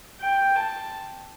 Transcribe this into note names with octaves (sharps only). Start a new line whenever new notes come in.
G5
A5